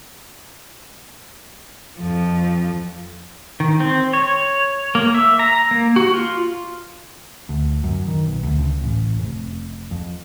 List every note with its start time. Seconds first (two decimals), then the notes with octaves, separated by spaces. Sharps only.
1.99 F2 F3
3.60 D#3
3.80 C4
4.13 C#5
4.95 A#3
5.15 E5
5.39 A#5
5.71 A#3
5.96 F#4
6.14 F4
7.49 D2
7.84 F#2
8.08 D#3
8.26 B1
8.43 D2
8.58 C#2
8.84 A1
9.19 F1
9.91 F2